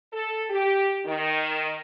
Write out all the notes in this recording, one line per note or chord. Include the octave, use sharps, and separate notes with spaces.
A4
G4
D#3